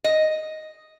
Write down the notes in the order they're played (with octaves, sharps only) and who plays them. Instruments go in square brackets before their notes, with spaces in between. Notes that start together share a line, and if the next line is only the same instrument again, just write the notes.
[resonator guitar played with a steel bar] D#5